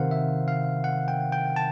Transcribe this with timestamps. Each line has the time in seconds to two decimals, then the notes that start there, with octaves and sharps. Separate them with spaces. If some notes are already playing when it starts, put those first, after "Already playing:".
Already playing: C3 D#3 A#4 C5 F5 F#5
0.11 E5
0.48 F5
0.84 F#5
1.08 G5
1.32 G5
1.56 A5